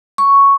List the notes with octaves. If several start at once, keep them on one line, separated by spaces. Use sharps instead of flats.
C#6